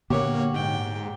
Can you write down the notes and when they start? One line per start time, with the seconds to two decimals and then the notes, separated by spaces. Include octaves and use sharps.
0.10 A#2 D3 A#3 B3 G4 C#5 F#5
0.54 G#2 G5